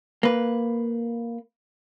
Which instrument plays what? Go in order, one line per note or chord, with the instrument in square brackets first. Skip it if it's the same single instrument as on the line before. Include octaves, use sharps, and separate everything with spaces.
[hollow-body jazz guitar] A#3 B4